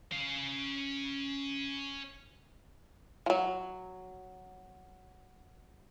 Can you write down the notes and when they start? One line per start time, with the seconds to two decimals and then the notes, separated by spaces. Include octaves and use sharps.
0.12 C#4 F5
3.26 F3 F#3